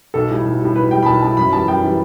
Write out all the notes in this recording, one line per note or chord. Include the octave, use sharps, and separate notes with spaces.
B1 A4
A2 G3
B1
A2 G3
B1 B4
A2 G3 G5
B5
B1 A5
A2 G3 A5
F#2 B5
E3 G3 A5
F#2 G5
E3 G3